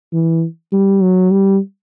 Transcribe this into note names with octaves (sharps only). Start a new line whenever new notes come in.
E3
G3
F#3
G3